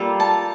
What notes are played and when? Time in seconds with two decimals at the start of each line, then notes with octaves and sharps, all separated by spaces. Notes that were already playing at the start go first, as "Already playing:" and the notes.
Already playing: G3 A#3 F4 A4
0.20 A5